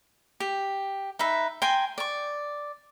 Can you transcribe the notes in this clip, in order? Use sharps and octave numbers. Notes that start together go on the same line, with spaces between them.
G4
D#4 B4 E5
G5 G#5 A#5 C6
D5 C#6